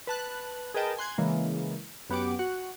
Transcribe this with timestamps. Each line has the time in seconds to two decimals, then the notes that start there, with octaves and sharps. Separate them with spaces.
0.07 B4 A5 F#6
0.74 G#4 A#4 B4 D#5 G5 A5
0.97 G#5 C6 F#6 G#6
1.18 C#3 E3 G#3 A#3
2.10 F#2 B3 G4 F#5 D6
2.39 F#4 F#5